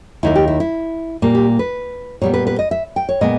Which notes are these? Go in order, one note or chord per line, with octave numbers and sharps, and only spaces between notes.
D#2 D#3 A#3 E4
G4
E4
E4
A#2 G3 A#3
G4
B4
A#2 G3 B3 C#5
B4
B4
D#5
E5
G5
C#5
A#2 G#3 B3 D#5